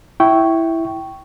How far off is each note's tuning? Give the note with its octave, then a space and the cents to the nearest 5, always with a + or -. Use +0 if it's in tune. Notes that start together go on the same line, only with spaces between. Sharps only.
E4 +0 G5 -15 C#6 +0